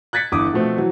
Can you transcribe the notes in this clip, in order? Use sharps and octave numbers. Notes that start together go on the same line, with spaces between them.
F#6 G#6 A6 B6 C#7
G1 E3 D6 D#6
B2 F3 A3 C4
E3 F#3